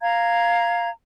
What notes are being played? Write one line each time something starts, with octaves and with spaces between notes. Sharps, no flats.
F5 A#5 G#6